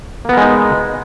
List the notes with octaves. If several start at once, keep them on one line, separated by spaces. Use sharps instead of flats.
G#3 A#3 B3 D#4 A#4